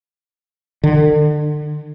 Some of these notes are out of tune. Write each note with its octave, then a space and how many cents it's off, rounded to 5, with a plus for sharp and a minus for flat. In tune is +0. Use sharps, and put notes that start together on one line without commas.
D3 +35